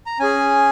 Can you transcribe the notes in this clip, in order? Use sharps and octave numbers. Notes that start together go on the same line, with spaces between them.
A#5
C#4 G#4 G#5